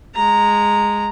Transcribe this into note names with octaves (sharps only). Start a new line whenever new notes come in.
G#3 A#5